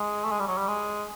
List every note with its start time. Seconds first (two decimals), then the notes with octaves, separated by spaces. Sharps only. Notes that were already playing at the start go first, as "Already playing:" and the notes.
Already playing: G#3
0.25 A3
0.31 G#3
0.39 G3
0.47 F#3
0.58 G3
0.68 G#3